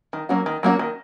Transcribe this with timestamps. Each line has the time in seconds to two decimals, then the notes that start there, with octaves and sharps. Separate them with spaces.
0.13 D#3
0.29 F#3 A#3 C#4 F#4
0.46 D#3
0.63 F#3 A#3 C#4 F#4
0.79 D#3